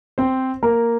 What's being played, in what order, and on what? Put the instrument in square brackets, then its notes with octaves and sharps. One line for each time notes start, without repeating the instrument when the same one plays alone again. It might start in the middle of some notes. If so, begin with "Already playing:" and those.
[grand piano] C4 C5
A#3 A#4